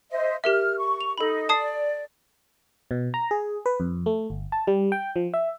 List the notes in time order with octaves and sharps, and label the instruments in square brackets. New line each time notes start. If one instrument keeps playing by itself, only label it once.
[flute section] C5 D#5 E5
[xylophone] G4 A#4 E5 [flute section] F6
[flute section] C#6
[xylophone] F7
[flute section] D#4 [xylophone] A4 B5
[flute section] D5 [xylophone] A5 D#6 C7
[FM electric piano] B2
A#5
G#4
B4
F2
A3
G1
A5
G3
G5
F3
E5